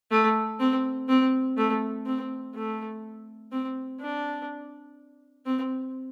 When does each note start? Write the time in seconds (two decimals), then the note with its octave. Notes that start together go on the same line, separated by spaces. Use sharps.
0.11 A3
0.59 C4
1.09 C4
1.57 A3
2.06 C4
2.55 A3
3.52 C4
4.00 D4
5.46 C4